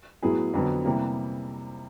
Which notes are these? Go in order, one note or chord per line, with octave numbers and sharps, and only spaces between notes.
A2 F#3 B3 E4 G#4
F2 D3 F#3 B3
C3 E3 G3 A#3